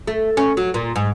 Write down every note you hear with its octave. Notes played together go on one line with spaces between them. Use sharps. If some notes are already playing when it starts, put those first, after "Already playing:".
A3
C#4
F#3
A#2
G#2